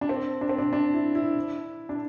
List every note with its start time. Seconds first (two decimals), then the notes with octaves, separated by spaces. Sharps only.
0.01 D4
0.09 C4
0.41 D4
0.49 C4
0.58 D4
0.73 D4
0.94 E4
1.15 E4
1.89 D4